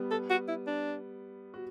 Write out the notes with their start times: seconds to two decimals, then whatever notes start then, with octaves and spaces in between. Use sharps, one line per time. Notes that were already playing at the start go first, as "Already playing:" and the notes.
Already playing: G3 B3
0.11 A4
0.30 F#4
0.48 E4
0.67 D4
1.54 F#4